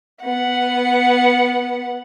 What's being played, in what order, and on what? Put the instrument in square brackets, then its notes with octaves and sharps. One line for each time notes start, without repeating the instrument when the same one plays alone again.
[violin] B3 F#5